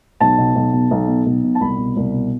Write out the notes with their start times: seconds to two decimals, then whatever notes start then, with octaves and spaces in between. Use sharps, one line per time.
0.20 B1 A5
0.38 B2
0.56 B1
0.73 B2
0.91 B1
1.08 B2
1.26 B1
1.44 B2
1.55 A5
1.61 C2 B5
1.78 B2
1.97 C2
2.14 B2